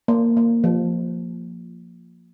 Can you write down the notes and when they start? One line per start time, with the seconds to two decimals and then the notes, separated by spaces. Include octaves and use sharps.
0.08 A#3
0.37 A#3
0.64 F3